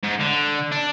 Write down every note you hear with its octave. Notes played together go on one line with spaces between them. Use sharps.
G#2
D3
D4